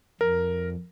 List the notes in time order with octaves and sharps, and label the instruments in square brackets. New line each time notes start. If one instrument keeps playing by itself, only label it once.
[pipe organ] F2 [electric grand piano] A#4